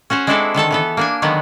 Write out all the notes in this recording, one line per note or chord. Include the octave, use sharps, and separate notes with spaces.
C#4 F#4 C5 C#5
G#3 C4 D4 E4 A4 D5
D3 D#3 A4 A5
E3 B3 A4
A#3 D4 G#5
D3 D#3 F#3 G#3 B3